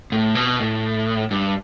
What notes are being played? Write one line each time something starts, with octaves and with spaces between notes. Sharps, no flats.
A2
B2
A2
G2